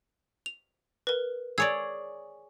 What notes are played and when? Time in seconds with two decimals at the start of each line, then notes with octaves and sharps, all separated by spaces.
0.46 F7
1.07 A#4 B4
1.58 G#4 C#5 D5 E6